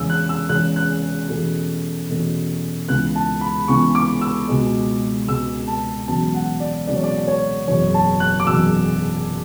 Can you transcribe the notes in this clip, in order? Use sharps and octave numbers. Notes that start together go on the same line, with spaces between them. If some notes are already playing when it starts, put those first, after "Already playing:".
Already playing: E2 C#3 G#3 C#4 E6
F#6
E6
E2 C#3 G#3 C#4 F#6
F#6
E2 B2 A3 C#4
E2 B2 A3 C#4
C#2 C#3 E3 B3 F#6
A5
B5
C#2 C#3 E3 B3 C#6
D6
E6
C#2 B2 G#3
C#2 B2 G#3 E6
A5
E1 E2 C#3 F#3 B3 A5
F#5
D5
E1 E2 C#3 F#3 B3 D5
C#5
D5
D5
C#5
F#1 E2 B2 F#3 C#5
A5
F#6
D6
F#1 E2 B2 F#3 E6